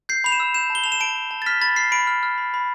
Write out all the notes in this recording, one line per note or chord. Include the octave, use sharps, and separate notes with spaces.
G6 C7
B5 F7
E7
E6
G6 E7
A5
G7
A5 F7
E7
A5 D7
A5
A5
A6
F6 B6
B5 A6
F6 C7
B5 D7
F6
F6
B5
B5